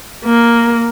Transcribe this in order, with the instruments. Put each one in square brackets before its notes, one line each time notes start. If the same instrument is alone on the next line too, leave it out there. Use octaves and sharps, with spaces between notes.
[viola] A#3